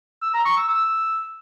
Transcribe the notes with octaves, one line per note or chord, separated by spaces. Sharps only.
E6
A#5
C#6
E6
E6